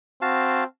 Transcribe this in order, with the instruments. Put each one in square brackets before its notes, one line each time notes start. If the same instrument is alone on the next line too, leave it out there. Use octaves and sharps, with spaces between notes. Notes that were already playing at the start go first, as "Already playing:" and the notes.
[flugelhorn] C4 [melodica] F#4 F5 A5